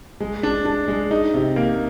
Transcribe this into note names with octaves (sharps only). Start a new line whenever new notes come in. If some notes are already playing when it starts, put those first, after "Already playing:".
G#3
D4
D4
G#3
D#4
C3
A#3